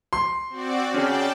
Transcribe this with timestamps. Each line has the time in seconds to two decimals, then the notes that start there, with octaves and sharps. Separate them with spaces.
0.13 C6
0.50 C4 F#4 D5
0.94 C#4 G#4 D5 G5 A5